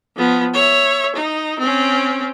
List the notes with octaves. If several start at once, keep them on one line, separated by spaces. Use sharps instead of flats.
F3 B3
C#5 E5
D#4
C4 C#4